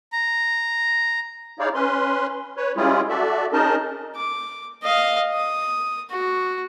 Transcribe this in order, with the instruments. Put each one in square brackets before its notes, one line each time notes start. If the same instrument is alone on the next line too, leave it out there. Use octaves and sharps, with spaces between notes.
[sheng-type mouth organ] A#5
[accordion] D#4 E4 G#4 C#5 D5 F5
C#4 B4 C6
B4 C#5
G3 G#3 C#4 E4 F4 G#4
F#4 A4 D5 E5
C#4 D#4 G#4 A#4 D#5 A5
[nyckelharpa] D6
D#5 F5
D#6
F#4